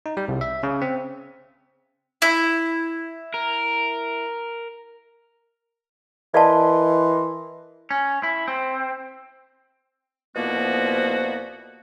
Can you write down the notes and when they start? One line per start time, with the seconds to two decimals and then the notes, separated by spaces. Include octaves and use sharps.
0.06 D#4
0.17 G3
0.28 C2
0.41 E5
0.63 C#3
0.82 C4
2.22 E4
3.34 A#4
6.34 E3 A#4 D5 D#5 F5 A5 C6
7.91 C#4
8.23 E4
8.48 C4
10.36 C2 B2 F3 A#3 B3 F#4